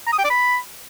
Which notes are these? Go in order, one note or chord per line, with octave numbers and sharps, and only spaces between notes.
A#5
D#6
G5
D5
B5